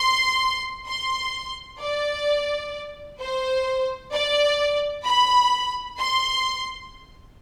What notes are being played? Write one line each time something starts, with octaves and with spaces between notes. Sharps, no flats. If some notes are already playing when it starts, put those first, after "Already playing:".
Already playing: C6
C6
D5
C5
D5
B5
C6